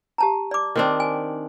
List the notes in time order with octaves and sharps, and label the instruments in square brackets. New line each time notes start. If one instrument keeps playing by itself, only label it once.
[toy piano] G4 A5 A#5
D5 D6
[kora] D#3 C4 D4
[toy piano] G#5